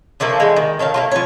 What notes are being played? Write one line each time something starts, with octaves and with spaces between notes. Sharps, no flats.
D3 F3 A3 A#3
E3 G#3
D#3
D#3 A4 C#5 F5
A3 A#3 F4
F3 C#5